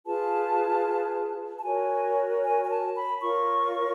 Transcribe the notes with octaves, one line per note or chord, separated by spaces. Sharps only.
F4 G#4 B4 A5
A5
F#4 A#4 C#5 G#5
G#5
G#5
A5
B5
F4 A#4 C#5 C#6